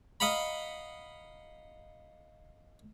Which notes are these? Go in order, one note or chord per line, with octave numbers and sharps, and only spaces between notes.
D#5 F5 F#5 A#5 B5